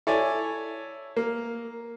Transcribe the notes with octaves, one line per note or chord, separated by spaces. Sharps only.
E4 A4 C#5 D5 G#5
A#3